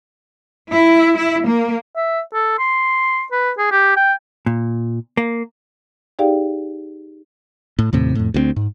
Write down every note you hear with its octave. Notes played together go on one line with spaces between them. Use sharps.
E4
E4
A#3
E5
A4
C6
B4
G#4
G4
G5
A#2
A#3
D#4 G4 G#4 D5 F5 G5
A2
D#2 A2 C3
F2 A2
D2 F#3 C4
G#2